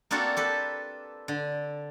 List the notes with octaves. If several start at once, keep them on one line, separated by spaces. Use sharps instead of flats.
A#3 C4 D4 F4 F#4 A4
G4 A4 B4
D3